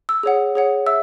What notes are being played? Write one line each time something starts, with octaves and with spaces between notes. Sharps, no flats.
E6
G#4 C#5 F#5
G#4 C#5 F#5
E5 E6